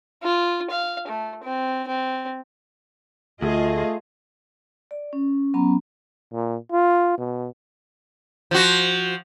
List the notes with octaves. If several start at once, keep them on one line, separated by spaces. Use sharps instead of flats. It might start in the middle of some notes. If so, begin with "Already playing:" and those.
F4
F5
A3
C4
C4
D2 A3 F4 G#4 D#5
D5
C#4
F#3 B3 C#4 A#5 B5
A#2
F4
B2
F3 F#4